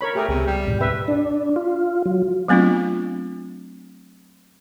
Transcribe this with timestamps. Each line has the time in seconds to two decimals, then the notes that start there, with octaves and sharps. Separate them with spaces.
0.01 A#4 C#5 B5
0.15 A3 G4 G#4 A#4
0.28 C#2 C3 G#3 B3
0.47 G3
0.66 D2 G#2 B2
0.81 C3 B4 E5
1.08 D4
1.56 F4
2.06 F#3
2.48 F#3 A3 B3 C4 D4 F4